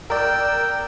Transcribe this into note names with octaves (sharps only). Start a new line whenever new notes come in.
A#4 D5 G5 E6